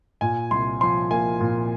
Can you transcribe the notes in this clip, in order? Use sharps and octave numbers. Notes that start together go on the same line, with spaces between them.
A#2 G#5
C2 C6
F3 C6
A#3 G#5
A#2